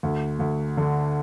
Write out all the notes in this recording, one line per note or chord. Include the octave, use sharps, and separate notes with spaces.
D2
D2
D3